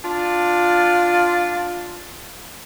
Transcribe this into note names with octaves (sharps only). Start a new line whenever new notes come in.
D4 F4